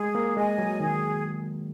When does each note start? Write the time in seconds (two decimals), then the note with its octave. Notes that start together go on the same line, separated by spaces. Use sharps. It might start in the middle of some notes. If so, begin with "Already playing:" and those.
Already playing: G#3 G#4
0.15 A#3
0.37 G#3 D#5 G#5
0.58 F#3
0.79 D#3 G#4